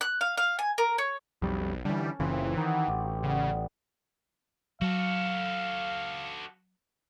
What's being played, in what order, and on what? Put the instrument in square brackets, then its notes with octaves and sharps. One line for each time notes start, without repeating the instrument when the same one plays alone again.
[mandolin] F#6
F5
F5
G#5
A#4
C#5
[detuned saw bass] B1 [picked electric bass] F2 G3
[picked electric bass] D3 E3 [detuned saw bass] G3 [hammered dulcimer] C#4 A4
[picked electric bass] F#1 A#2 C#3 [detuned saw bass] E3 [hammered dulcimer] C4
[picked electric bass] D#3 [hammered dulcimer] D#4 F#4 G4
[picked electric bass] A1 [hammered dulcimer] D6
[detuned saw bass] C#3 [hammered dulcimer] G3 B3
[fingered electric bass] F#3 [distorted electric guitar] F#4 A4 [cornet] F5